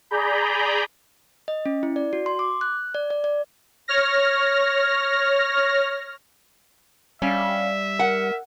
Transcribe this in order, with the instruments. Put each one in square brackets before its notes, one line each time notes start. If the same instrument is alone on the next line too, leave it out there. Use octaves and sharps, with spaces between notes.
[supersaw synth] G#4 D5 A#5 B5 G6
[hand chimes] D#5
C#4
E4
D5
F#4
C6
D6
F#6
D5
D5
D5
[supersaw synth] C#5 F6 A#6
[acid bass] G3 [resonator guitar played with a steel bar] C#4 [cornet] E5 [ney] F5
[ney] A#4 [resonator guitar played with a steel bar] F#5